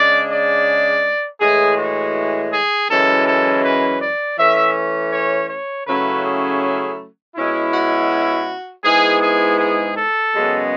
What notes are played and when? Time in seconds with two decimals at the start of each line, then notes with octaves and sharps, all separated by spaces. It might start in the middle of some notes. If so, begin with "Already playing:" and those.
Already playing: C#3 G#3 D4 D5
0.29 D5
1.41 A2 E3 G#3 G#4
1.77 F#4
2.52 G#4
2.89 F#2 E3 G#3 C#4 E4 A4
3.27 A4
3.64 B4
4.02 D5
4.38 E3 A3 C#4 E5
5.13 C#5
5.49 C#5
5.87 C#3 F#3 A3 C#4 E4 B4
6.25 G#4
7.36 B2 G#3 C#4 E4
7.73 F#4
8.84 G#2 G#3 B3 E4 G#4
9.21 G#4
9.59 G#4
9.96 A4
10.34 F#2 C#3 G#3 B3